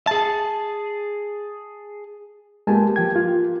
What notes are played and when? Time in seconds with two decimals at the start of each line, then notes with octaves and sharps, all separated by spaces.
0.07 G#4 A5
2.67 G#3 A#3 B3 G4 G#5 A5
2.96 F3 G5 G#6
3.16 F4